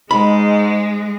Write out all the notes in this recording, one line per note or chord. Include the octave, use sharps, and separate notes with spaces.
G#2 G#3 B5